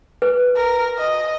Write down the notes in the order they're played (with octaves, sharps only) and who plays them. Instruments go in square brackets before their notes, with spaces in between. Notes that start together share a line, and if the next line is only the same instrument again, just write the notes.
[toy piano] B4
[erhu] A#4
D#5